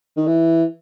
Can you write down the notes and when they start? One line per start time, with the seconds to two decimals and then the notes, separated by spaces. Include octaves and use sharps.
0.17 D#3
0.27 E3